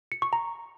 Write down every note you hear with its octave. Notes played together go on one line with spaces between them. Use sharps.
C#7
C#6
A#5